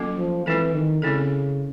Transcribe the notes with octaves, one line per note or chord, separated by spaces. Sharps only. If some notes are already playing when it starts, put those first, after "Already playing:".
Already playing: F#3 A#3 C#4 F4 A4
F3
E3 G#3 C4 E4 A4
D#3
C#3 G#3 C4 E4 A4